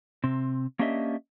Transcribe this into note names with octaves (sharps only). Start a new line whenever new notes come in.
C3 C4
A#3 C#4 D4 G4 D#5 E5